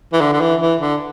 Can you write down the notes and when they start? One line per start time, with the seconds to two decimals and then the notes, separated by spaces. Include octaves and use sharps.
0.13 E3
0.21 D3
0.33 D3
0.41 E3
0.61 E3
0.81 D3